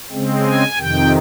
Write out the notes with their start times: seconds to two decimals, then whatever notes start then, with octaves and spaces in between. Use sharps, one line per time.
0.11 C#3 G#3 C4
0.45 G#5
0.77 F2 C3 D#3 G5